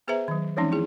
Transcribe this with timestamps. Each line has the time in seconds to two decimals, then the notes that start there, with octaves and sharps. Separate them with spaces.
0.08 B3 G#4 B4 C5 E5 A#5
0.28 D#3 F#3
0.57 E3 F3 G#3 C4 C#4 D#4
0.71 A#3 E4 G#4